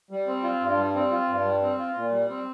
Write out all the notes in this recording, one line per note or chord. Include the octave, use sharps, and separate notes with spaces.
G3
C4
F4
G2
G3
C4
F4
G2
G3
C4
F4
A#2
G3
C4